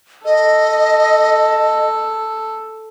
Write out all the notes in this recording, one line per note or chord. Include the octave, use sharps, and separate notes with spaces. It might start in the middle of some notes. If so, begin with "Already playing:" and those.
A4 D#5